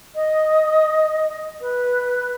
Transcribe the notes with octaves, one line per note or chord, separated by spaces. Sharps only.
D#5
B4